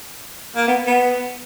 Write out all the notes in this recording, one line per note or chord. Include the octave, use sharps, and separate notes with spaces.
A#3
B3
B3